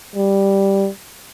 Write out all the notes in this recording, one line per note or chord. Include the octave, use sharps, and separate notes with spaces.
G3